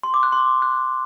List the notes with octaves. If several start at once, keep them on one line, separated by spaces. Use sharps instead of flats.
C6
D6
F#6
C6
F#6